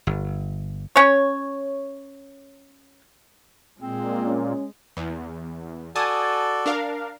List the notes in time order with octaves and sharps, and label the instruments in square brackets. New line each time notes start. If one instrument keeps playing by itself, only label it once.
[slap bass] G1
[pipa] C#4 C#5
[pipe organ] A#2 [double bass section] G#3 [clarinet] C4
[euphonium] C#4
[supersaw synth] E2
[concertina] F#4 A4 D5 [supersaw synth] G#5 A5 D#6
[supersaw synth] D4 A#4 F5